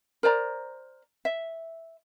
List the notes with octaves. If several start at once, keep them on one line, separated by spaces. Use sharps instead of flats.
A#4 C5 D5 A#5
E5